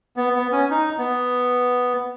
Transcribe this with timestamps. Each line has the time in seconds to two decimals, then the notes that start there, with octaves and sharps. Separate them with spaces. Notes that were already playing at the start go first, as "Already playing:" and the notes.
0.17 B3
0.35 B3
0.52 C#4
0.71 D#4
0.98 B3